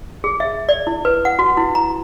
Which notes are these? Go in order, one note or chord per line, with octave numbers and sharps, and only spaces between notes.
G#4
E5
D5
E4
B4
F#5
F#4
E4
A#5